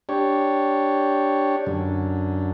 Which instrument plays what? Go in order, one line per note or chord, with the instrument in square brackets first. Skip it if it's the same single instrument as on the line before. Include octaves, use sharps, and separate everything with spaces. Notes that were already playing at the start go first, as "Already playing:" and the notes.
[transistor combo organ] D4 G4 C#5
F#2 D3